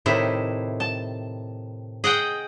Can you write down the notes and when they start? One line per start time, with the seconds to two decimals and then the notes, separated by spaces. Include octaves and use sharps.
0.06 A2 C3 D#3 E4
0.80 A5
2.04 G#4 D#5 F#5 G5